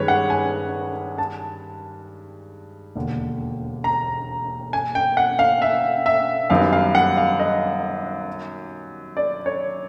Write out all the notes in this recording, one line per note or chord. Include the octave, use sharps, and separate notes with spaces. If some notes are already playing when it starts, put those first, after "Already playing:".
Already playing: G2 D#3 G#3 B4 C#5
F#5
G#5
A5
E1 D#2 D3
A#5
G#5
G5
F#5
F5
E5
E5
F#2 D#3 G3 B3 D#4 F5
F5
F#5
F5
D#5
D5
C#5